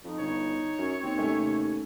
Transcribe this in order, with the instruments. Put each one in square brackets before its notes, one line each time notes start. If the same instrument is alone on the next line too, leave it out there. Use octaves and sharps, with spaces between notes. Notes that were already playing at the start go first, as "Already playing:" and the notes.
[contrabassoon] F2 [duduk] D#4
[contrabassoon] G1 [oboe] C#5
[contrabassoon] F#2
[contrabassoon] D#2 [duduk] C4
[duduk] C3 [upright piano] A3 C#4